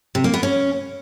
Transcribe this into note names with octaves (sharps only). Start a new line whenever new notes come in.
C3
A#3
B3
C#4